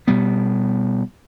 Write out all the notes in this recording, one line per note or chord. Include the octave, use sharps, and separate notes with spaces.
B2 G3 B3